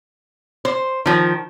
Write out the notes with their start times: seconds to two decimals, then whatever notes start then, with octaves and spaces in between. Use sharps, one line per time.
0.65 C5
1.06 D#3 F3